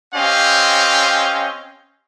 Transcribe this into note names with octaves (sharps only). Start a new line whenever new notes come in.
C4 C#4 G4 D#5 F5